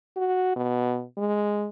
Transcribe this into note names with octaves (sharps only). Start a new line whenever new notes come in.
F#4
B2
G#3